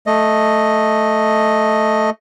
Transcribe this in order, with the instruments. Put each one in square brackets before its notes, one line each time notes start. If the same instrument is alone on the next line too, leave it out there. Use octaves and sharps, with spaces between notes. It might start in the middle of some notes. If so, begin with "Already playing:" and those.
[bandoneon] A3 D#5